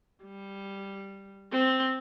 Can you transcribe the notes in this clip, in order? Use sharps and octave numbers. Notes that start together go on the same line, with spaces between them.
G3
C4